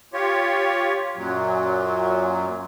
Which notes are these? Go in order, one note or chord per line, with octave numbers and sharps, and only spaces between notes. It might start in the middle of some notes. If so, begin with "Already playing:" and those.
F4 G4 C#5
F#2 A#2 F#3